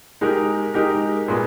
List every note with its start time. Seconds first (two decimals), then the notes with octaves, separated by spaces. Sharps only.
0.21 G#3 D#4 G4 A#4
0.74 G#3 D#4 G4 A#4
1.28 A#2 G#3 B3